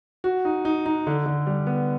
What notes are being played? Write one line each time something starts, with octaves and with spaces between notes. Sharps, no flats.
F#4
D#4
D#4
D#4
D3
D3
G3
B3